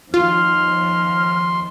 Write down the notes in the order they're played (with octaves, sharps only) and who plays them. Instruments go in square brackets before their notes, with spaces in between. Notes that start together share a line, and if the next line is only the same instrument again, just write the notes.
[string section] D#2 F3 [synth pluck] F4 [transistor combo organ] C6 [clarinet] F6